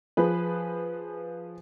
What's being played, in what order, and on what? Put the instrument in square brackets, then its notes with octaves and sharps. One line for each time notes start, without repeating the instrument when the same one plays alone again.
[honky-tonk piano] F3 G#4 B4